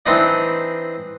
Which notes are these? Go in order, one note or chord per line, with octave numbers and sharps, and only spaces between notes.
E3 C4 D4 D#4 D5